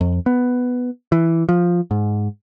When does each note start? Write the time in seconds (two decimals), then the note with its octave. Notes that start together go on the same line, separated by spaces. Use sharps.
0.01 F2
0.26 B3
1.12 E3
1.49 F3
1.91 G#2